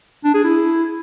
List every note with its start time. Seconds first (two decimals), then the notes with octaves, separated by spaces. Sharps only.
0.24 D4
0.34 G#4
0.44 E4